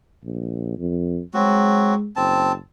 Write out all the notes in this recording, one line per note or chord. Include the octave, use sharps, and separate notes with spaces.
A#1
F2
F#3 G#3 C4 F#4
F#1 C4 A5